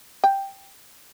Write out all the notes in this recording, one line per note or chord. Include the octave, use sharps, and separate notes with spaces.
G5